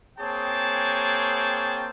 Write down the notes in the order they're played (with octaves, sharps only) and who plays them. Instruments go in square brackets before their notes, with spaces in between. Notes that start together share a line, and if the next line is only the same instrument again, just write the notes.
[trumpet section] A#3 C4 G#4 C#5 G5 A5